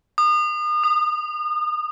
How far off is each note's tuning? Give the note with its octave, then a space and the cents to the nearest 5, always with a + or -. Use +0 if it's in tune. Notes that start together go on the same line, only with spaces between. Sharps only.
D#6 -35
D#6 -10